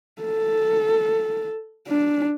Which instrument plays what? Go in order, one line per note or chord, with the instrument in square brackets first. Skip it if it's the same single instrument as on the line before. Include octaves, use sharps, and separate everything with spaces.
[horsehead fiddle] A4
D4